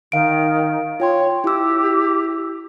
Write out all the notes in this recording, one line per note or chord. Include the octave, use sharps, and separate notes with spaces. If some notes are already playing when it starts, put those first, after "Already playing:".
D#3 F5 D7
F4 C#5 G5 C6
E4 G4 E6